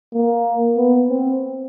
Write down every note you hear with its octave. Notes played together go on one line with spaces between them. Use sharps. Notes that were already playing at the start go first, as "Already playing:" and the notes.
A#3
B3
C4